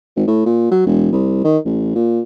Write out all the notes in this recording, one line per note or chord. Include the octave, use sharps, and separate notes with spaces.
G#1
A2
A#2
F#3
E1
C2
D#3
A1
A#2